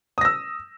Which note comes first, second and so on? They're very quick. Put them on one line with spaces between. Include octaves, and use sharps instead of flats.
D#6 A#6 E6